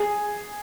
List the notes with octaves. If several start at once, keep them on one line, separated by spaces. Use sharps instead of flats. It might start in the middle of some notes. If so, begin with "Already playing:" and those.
Already playing: G#4